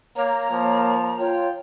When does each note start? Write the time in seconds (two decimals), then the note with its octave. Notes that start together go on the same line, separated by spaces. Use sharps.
0.16 A#3 C#5 A#5
0.50 F3 A#3
1.19 F4 C#5 G5